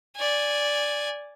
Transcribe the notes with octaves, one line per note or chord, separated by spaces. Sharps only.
D5 G#5